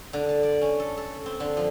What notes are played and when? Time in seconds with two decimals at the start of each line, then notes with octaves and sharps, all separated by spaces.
0.13 D3
0.29 A5
0.43 D5
0.61 C#4
0.80 A4
0.97 A4
1.26 C4
1.40 D3
1.57 F3